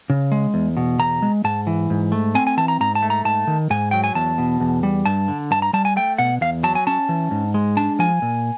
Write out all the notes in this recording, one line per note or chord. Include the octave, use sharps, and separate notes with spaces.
C#3
G#3
E2
B2
E2 A#5
G#3
G#2 A5
E3
G#2
A3
C4 G#5
G#5
E3 A5
A#5
G#2 A#5
A5
A3
A#5
G#2 A5
D#3
G#2 G#5
F#3 G5
G#5
E2 A5
B2
E2
G3
G2 A5
D3
G2 A5
A#5
G3 A5
G#5
A3 G5
B2 F#5
E2 F5
F#3 A5
G#5
C#4 A5
E3
G#2
G#3
D4 A5
F3 G#5
A#2